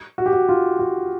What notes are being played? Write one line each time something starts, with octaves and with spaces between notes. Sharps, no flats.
F#4
G4
F#4
F4
F#4